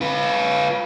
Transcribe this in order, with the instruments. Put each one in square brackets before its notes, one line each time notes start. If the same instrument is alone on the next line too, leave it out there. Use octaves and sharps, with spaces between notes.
[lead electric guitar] F4 B4